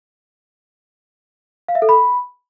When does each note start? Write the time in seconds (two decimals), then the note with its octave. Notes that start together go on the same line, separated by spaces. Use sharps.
1.68 F5
1.75 E5
1.82 A4
1.89 B5